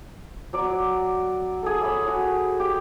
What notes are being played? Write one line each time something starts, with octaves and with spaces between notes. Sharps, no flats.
F#3 D5
G#4 A4
C#5 B5 E6
F#4
G4